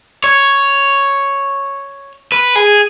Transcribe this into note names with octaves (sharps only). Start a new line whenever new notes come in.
C#5
B4
G#4